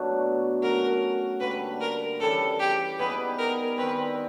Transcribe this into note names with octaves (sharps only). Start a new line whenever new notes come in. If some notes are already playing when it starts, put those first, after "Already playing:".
Already playing: B2 F#3 A3 D4
F#3 A3 C#4 F#4 A#4
D3 G3 A#3 B4
A#4
C#3 E3 G3 A4
G4
G3 B3 D#4 G#4 B4
A#4
D#3 G3 C4 B4